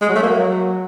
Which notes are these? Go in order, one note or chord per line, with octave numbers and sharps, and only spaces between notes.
G#3
F#3
A3
A#3
F#3